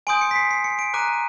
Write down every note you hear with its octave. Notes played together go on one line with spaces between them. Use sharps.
G#5 C6 D#6 G6 D7
C#7
B6
C7
C7
C#7
D7
A#5 D6 F#6 D#7
D#7